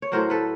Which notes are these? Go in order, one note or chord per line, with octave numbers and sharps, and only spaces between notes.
C#5
A2 F#3 A#4 C5
A4 B4